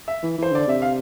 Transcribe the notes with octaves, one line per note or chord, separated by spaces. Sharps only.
E5
E3
E3 C5
D3 D5
C3 E5
F5